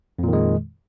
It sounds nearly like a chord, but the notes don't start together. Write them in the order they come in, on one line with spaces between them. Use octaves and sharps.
F2 A#2 D#3 G#3